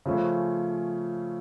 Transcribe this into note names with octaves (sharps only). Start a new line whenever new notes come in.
C#3 F3 A3 C#4